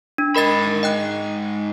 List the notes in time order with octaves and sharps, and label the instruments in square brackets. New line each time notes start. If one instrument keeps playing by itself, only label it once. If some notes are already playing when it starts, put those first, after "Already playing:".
[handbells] D4
[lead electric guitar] G#2 B5 [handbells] A#4 D#5 A6
[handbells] D#5 G5 F#6